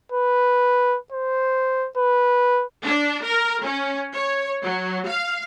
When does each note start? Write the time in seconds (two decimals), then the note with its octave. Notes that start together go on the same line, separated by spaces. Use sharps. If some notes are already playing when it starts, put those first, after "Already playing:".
0.12 B4
1.12 C5
1.97 B4
2.83 D4
3.22 A#4
3.63 C#4
4.13 C#5
4.63 F#3
5.08 F5